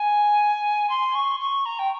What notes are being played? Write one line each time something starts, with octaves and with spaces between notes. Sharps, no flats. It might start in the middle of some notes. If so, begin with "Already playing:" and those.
Already playing: G#5
C6
C#6
C#6
A#5
G5